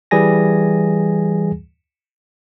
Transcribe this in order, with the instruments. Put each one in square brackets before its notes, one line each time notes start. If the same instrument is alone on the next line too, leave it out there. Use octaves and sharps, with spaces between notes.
[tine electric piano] E3 G3 G#4 G#5 A#6